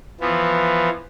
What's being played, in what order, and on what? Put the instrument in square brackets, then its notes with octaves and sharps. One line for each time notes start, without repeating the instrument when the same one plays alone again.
[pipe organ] E3 F3 B3